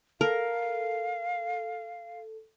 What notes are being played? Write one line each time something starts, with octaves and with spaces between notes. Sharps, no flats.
A4 A#4 F5